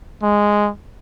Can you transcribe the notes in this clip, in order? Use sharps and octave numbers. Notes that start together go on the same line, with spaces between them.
G#3